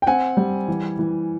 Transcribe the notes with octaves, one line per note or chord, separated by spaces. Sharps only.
G5
C4 F#5 G#5
G3
E3
E3